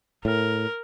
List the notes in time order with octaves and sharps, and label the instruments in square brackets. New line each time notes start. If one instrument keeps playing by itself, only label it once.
[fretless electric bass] A2 [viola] A#4